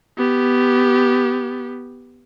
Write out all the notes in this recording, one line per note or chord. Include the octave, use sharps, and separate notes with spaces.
B3 G4